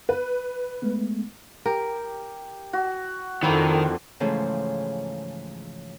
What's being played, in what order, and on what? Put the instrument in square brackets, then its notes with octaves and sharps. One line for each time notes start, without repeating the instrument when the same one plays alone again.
[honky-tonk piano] B4
[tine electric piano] G#3 A3 B3
[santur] G4 [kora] A#4
[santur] F#4
[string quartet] F2 D3 F3 [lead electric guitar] D#3 [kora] A#3 C4 E4
[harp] G#2 C#3 E3 F3 A3